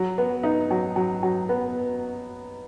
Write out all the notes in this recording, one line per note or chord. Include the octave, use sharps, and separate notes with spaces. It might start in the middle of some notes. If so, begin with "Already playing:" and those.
Already playing: F#3
B3
D#4
F#3
F#3
F#3
B3